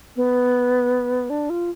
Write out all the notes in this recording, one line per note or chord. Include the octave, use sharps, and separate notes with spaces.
B3
D4
F4